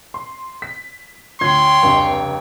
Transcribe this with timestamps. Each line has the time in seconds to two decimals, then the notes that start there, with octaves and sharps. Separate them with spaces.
0.14 C6
0.62 B6
1.41 D2 F4 C#5 G5 C6 G#6
1.83 F1 C#2 G2